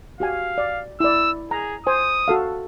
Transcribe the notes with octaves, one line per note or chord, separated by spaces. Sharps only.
F#4 G4 F5 G#5
D5
E4 D5 E6
G#4 A#5
C5 G#5 D#6
F#4 A4 F5